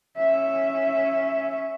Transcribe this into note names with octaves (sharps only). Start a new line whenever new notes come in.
C#4 E5